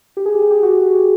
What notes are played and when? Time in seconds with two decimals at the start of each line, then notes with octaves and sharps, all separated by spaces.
0.17 G4
0.26 G#4
0.35 G4
0.42 G#4
0.51 G4
0.63 F#4